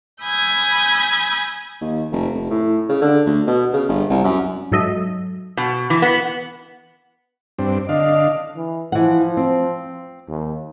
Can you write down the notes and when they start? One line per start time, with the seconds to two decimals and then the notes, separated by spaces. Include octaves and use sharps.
0.23 G#5 B5 D#6 E6 G6 G#6
1.81 D#2
2.12 F1
2.34 F1
2.50 A2
2.89 C#3
3.02 D3
3.26 D2
3.47 B2
3.73 C#3
3.88 G1
4.10 C2
4.24 F#2
4.71 G#2 F#3 A4 D#5 E5
5.57 B2
5.90 E3
6.02 B3
7.59 G2 C4 D4
7.89 D3 D4 D#5 F5
8.56 E3
8.92 E3 F3 F#5
9.37 C4
10.28 D#2